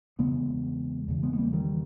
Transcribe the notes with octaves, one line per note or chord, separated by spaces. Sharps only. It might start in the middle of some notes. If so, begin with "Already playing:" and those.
E2 C#3 G#3 B3
E2 C#3
G#3 B3
B3
G3 A#3
D#3 G3